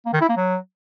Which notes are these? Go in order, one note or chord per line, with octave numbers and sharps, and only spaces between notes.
A#3
D#3
E4
A#3
F#3